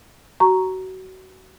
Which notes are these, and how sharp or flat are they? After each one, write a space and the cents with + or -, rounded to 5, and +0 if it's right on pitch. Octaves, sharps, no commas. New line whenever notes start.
F#4 +25 A#5 +0 C#6 +0